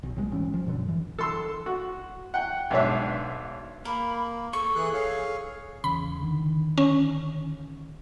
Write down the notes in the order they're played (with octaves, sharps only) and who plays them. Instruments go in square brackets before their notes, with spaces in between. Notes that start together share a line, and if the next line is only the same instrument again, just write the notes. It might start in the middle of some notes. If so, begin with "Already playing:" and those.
[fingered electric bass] B1
C2 A#2 G3 G#3
G#1 E3 C#4
F3
F#2 B2 D3 F#3
E3
[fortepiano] A4 C6 E6
F#4
F#5 G5
B1 G#2 D4 C#5 E5
[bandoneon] A#3 [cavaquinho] A#4 [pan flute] B5
[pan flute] A4 [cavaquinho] C#6
[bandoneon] E3 G#4 F#6
G#4 C#5 F5
[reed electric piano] E2 C#3 [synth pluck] B5
[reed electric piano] D3 D#3
[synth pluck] C#4